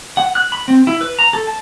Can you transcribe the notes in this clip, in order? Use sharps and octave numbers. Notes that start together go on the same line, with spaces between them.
F#5
F#6
B5
C4
E4
B4
A#5
A4
A5